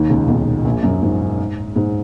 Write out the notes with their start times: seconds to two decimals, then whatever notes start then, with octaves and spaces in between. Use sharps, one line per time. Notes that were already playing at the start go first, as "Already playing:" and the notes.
Already playing: D#2 D#3
0.09 C#2 C#3
0.23 A#2
0.28 B1 B2
0.65 A#1 A#2
0.83 F#2
1.02 G#2
1.76 G#2